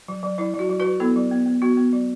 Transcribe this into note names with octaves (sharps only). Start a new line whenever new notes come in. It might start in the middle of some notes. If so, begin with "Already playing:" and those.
F#3
F#3
F#3 E4
F#3
F#4
F#3
F#3 F#4 B4
B3 E4 A4
F#3
B3
B3
B3 F#4
B3
F#3